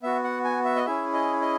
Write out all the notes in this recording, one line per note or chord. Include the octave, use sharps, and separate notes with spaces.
B3 F#4 E5
F#5
G#5
E5
D#5
C#4 E4 G#4 E5
D#5
D#5